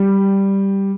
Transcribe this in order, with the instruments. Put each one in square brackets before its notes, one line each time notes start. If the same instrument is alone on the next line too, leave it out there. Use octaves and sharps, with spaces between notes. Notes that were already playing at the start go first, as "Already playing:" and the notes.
Already playing: [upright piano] G3